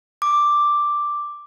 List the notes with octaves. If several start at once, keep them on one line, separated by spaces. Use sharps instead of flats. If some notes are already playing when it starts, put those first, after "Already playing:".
D6